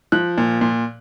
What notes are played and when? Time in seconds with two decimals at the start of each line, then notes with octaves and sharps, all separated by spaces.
0.12 F3 F#6
0.38 A#2
0.61 A#2